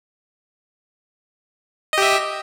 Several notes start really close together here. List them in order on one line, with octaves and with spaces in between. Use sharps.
D#5 G4 E5